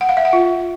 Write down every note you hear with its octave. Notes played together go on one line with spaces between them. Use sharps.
F#5
F5
E5
F#5
F4